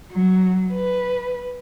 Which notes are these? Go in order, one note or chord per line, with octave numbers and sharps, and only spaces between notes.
F#3
B4